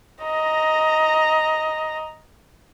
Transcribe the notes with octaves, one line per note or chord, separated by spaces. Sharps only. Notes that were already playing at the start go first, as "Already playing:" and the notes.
D#5 A#5